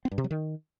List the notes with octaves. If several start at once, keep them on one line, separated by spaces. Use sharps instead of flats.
C4
G2
C3
F#3
D#3